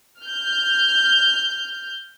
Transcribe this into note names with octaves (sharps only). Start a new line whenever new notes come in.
F6 G6